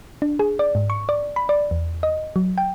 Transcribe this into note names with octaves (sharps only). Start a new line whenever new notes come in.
D4
G#4
D5
G#2
C#6
D5
B5
D5
E2
D#5
F#3
G5